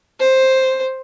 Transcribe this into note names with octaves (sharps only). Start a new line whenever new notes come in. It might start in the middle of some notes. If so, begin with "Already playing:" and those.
C5